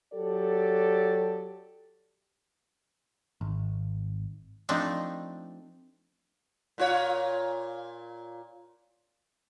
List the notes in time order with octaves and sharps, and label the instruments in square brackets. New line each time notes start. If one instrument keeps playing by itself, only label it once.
[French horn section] F#3 G4 A4 D5
[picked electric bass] G#1
[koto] F3 A3 C4 D4 D#4
[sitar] A#2 F4 C#5